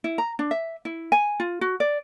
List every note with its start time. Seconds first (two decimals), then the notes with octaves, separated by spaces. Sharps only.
0.04 E4
0.18 A#5
0.39 D4
0.51 E5
0.85 E4
1.12 G#5
1.40 F4
1.61 F#4
1.80 D5